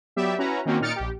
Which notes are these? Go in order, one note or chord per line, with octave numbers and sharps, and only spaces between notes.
F#3 B3 G4 D5 E5
C#4 E4 F#4 B4 A#5
D#3 A#3 C4 C#4 F#4
A#2 D#4 F6 A6 C#7 D7
A#1 G4